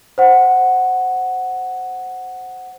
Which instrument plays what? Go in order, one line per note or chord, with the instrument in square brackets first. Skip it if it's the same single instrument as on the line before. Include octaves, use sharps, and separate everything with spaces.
[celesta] C5 F#5